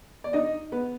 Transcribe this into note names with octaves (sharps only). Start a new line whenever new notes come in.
D5
D#4 D#5
B3 B4